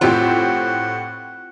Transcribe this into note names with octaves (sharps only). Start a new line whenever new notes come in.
A2 C4 F4 G4 C5 F#5